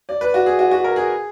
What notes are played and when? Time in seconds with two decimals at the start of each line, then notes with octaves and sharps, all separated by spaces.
0.09 D5
0.21 B4
0.34 F#4
0.46 G#4
0.59 F#4
0.71 F#4
0.84 A#4
0.96 G#4